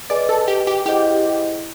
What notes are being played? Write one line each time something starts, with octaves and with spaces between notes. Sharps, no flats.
G#4 B4 D5 D#5 G#5
A4
G4
G4
E4 G4 G#4 C5 D#5 F#5